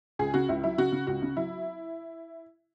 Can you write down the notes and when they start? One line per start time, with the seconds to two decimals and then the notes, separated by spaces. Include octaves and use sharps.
0.19 C#2 G#4
0.34 C#3 F#4
0.49 C#2 E4
0.63 F#3 E4
0.78 C#3 F#4
0.92 C#3
1.07 C#2 F#4
1.22 C#3
1.36 F#3 E4